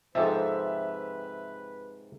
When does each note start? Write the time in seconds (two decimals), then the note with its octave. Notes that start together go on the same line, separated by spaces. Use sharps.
0.15 G#2 C3 F3 C4 A4 B4 E5